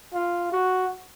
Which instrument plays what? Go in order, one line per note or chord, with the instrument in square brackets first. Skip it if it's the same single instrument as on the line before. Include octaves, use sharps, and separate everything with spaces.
[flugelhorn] F4
F#4